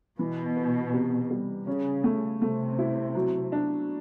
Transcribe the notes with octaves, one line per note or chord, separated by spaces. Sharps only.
B2 E3
B3
C3
G3
C#3 C#4
A3
C3 A3
E4
F#3
D4